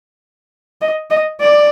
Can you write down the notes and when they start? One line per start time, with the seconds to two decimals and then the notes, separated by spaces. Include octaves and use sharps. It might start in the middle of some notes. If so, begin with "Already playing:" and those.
0.81 D#5
1.10 D#5
1.40 D5